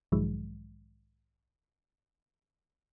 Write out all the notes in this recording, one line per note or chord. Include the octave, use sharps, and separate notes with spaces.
B1 G#2 D#3 F3 F#3 G#3